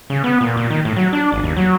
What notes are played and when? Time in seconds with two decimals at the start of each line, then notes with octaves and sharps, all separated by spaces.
0.10 C#3
0.24 B3
0.41 A#2
0.57 A#2
0.70 D#3
0.85 A2
0.96 F#3
1.13 D4
1.32 G#1
1.44 D#2
1.57 F#3